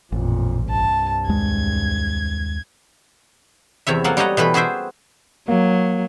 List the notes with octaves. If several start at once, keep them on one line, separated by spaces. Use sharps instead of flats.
A1 F2 A#2
C2 G2 A5
D#2 G#3 G#6
E2 C3 C#5 E5
F#3 A#3 A4 F#5
G3 G4 A4 C#5 D#5 F#5
B2 E3 A3 B4 B5
F#4 G#4 B4 C5 E5 G5
F#3 A#3